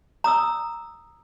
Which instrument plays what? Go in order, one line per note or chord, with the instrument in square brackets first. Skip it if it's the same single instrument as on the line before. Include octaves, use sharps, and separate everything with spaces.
[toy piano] A#5 D#6 E6